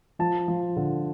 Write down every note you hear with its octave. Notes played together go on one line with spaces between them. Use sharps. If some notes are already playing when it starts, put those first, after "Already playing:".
F3 A5
F3
D3